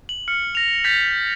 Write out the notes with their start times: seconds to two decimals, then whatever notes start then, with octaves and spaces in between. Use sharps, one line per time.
0.09 F#7
0.28 F6 C#7
0.55 A#6 F7
0.84 G6 A6 B6 F7